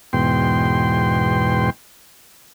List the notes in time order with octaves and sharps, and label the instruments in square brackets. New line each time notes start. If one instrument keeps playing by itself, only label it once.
[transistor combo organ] E2 G#2 B2 G5 C6